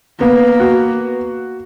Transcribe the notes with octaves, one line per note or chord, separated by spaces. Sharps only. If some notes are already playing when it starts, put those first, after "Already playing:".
A#3 B3
F#4